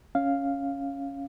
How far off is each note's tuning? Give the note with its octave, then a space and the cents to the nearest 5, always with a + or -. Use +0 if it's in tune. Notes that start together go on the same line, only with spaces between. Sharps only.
C#4 +0 F5 +0